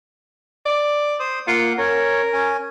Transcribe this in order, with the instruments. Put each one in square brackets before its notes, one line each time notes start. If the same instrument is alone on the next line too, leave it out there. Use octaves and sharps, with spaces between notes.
[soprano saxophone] D5
[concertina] C5 D#6
[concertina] A#3 F#5 [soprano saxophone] F4
[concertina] C#4 C#5 [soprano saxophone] A#4
[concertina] C#4 G#5